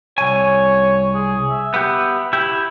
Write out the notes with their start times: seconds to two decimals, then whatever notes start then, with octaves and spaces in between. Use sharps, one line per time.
0.18 C2 C#5 G#5
1.15 G#4
1.50 E5
1.74 B3 G4
2.33 E4 G4